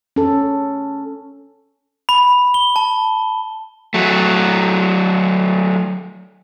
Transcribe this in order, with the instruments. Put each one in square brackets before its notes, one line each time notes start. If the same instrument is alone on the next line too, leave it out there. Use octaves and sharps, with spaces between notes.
[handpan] C#4 A4
[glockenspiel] B5
G7
A5
[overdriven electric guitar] F#3 A3